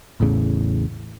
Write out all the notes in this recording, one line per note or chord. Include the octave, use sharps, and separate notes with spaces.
A1 E2 A2 C#3